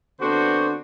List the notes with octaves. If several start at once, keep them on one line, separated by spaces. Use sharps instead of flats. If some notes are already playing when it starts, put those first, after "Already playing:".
D3 B3 C4 D4 F#4 C5